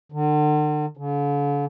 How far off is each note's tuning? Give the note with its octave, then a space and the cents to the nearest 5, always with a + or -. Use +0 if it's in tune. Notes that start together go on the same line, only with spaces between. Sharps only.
D3 +40
D3 -45